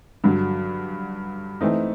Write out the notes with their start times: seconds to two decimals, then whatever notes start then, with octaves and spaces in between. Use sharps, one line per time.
0.24 G2 D3 F#3
1.61 E3 A3 C4 D#4